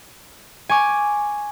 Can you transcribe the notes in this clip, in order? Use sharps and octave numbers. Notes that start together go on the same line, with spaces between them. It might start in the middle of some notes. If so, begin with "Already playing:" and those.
G#5 C#6 D6